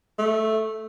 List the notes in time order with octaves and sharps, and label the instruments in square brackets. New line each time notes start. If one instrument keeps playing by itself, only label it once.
[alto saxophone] A3